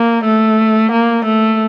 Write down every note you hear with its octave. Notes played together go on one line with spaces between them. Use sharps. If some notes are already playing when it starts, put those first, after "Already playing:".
Already playing: A#3
A3
A#3
A3